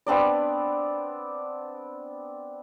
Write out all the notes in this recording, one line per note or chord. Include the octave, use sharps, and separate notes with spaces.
B3 C4 D4 D5